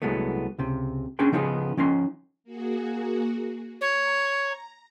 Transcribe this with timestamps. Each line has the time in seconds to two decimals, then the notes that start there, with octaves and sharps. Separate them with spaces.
0.02 C2 F#3 G#3 A3 B3
0.58 C#2 C3
1.19 C#4 D4 G#4 G5 C6
1.32 C#3 F3 G3 B3 D#4 G#4
1.77 F3 C#4 D#4 C6
2.44 A#3 F#4 G#4
3.81 C#5 A#5